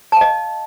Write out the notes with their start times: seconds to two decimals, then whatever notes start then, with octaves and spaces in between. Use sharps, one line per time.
0.12 A5
0.17 F5
0.21 D#5